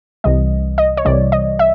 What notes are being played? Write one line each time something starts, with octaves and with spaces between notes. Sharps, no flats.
C2 C3 E3 G3 D#5
D#5
C#5
C2 C3 E3 G3 D5
D#5
E5